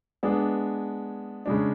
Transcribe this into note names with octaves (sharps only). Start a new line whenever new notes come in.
G#3 B3 D4 G#4
C#3 G#3 D4